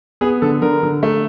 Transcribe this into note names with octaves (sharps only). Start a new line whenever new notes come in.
B3 G#4
D3 A4
D3 A#4
D3
A3